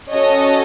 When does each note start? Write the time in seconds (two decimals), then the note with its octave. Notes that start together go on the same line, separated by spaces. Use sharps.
0.12 C#4 F#4 A4 C#5 D#5